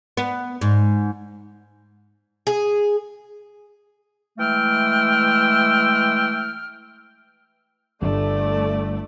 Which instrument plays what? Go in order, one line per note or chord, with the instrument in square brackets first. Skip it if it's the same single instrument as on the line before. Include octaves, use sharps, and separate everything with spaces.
[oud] B3
G#2
[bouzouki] G#4
[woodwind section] E3 G#3 A3 G5 E6 F6
[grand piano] G1 G2 [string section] A3 [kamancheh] D5